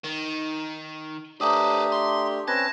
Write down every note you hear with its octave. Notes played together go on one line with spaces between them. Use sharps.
D#3
A3 D4 G4 B4 C5 A#5 D#6
C6
C4 C#4 B4 A5 G#6 A#6